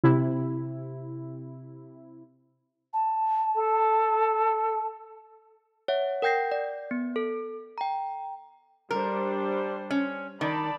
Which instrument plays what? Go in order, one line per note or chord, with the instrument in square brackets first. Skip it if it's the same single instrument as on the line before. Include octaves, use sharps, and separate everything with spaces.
[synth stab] C3 E4
[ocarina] A5
[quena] A4
[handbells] C#5 E5 F#5
A#4 F#5 G5 G6 A#6 C7
D5
B3
A4
G5 A#5
[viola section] G3 D4 C5 [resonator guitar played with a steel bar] A#4
[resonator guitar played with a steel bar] C#4
[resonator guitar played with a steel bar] D#3 [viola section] D5 A5 B5